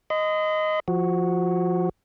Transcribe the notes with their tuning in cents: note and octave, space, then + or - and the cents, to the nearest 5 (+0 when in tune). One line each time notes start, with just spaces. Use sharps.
D#5 +0 C6 -45
F3 +0 F#4 +0